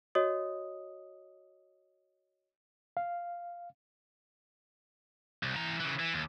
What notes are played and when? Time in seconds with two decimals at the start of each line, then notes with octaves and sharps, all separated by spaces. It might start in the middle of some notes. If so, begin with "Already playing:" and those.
0.15 F#4 C#5 D#5 D#6
2.97 F5
5.43 C2
5.56 E3 A#5
5.80 C#3 E3
6.00 E3
6.14 D#2